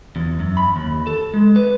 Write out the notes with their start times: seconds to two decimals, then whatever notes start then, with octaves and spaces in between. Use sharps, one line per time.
0.16 E2
0.39 F#2
0.57 B5
0.76 D#2
1.07 A4
1.34 G#3
1.56 B4